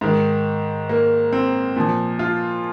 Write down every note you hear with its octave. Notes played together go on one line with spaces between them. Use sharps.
G#2 D#3
A#3
C4
A#2 F3
F4